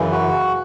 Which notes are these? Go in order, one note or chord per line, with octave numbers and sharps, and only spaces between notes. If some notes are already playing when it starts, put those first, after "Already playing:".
Already playing: F#2 C#3 E3
F#4